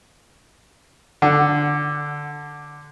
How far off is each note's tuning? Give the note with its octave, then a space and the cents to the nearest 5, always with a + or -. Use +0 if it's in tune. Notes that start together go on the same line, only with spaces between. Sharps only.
D3 +0 F#5 +0